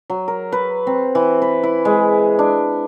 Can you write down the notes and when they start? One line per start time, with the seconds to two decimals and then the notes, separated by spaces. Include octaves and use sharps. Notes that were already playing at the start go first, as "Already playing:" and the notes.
0.10 F#3
0.28 A#4
0.52 B4
0.87 C4
1.15 E3
1.42 B4
1.63 E4
1.85 G#3
2.39 D4